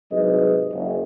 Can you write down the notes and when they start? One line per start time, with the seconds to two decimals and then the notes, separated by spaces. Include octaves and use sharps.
0.12 C2 G#2 F#3 G#4 B4 D#5
0.73 F#1